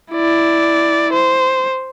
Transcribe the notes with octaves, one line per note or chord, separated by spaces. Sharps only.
E4 D5
C5